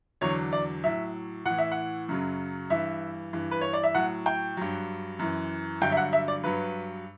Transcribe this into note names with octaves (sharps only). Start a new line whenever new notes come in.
E2 D3 F#3 C#5
D5
A2 F#3 E5
A2 E3 F#5
E5
F#5
F#2 C#3 F#3
G2 E3 E5
G2 E3
B4
C#5
D5
E5
A2 F#3 F#5
G5
G2 F#3
F#2 E3
G2 D3 F#3 G5
E5
F#5
E5
D5
G2 F#3 B4